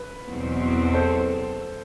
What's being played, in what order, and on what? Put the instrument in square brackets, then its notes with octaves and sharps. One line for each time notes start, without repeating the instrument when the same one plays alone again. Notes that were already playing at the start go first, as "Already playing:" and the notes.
Already playing: [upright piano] B4
[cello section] E2 B2 F#3 C4
[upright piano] A4 C5